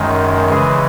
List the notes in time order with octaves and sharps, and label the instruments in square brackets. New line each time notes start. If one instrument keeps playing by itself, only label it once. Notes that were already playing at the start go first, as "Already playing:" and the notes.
Already playing: [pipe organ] F#2 D#3 G#3
C#3 E3 G#3 G#4